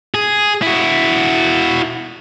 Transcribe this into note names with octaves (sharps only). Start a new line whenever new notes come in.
G#4
E4 F#4